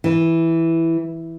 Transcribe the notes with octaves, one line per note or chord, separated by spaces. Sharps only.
E3